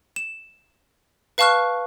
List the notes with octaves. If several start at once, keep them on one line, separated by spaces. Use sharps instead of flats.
E7
B4 F5 A5 C#6 F6 F#6